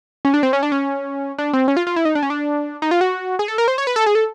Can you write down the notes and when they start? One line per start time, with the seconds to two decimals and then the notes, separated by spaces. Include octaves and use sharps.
0.25 C#4
0.34 D4
0.43 C4
0.53 C#4
0.63 D4
0.72 C#4
1.38 D4
1.53 C4
1.68 C#4
1.77 F4
1.87 F4
1.96 E4
2.05 D#4
2.15 D4
2.23 C#4
2.30 D4
2.82 D#4
2.91 F4
3.01 F#4
3.39 G#4
3.48 A4
3.58 A#4
3.68 C5
3.78 C#5
3.87 B4
3.96 A4
4.06 G#4
4.15 A4